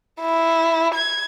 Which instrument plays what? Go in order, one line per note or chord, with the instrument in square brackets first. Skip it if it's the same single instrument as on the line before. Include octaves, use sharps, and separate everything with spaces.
[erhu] E4
G#6